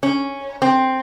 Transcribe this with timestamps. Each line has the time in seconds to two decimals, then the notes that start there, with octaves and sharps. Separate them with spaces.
0.03 C#4
0.62 C4